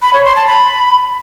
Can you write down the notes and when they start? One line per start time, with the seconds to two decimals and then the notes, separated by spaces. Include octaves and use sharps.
0.02 B5
0.13 C#5
0.25 C6
0.36 A5
0.47 B5